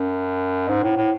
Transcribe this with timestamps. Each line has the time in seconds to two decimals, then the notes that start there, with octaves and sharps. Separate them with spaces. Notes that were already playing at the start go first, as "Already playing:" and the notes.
Already playing: F#2
0.69 G#2
0.83 A2
0.97 A2